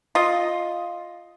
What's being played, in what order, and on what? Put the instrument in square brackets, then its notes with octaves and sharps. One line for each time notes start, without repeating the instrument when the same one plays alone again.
[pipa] F4 D#5